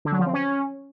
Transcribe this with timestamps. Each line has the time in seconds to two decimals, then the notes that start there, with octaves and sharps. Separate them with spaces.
0.05 D3
0.12 F#3
0.19 F3
0.26 C4
0.33 C#4